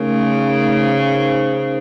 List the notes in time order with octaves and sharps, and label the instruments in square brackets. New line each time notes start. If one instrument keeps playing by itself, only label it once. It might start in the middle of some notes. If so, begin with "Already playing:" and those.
Already playing: [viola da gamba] C#3 [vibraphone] A3 D#4 A#4
[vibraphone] D#4
C5
C5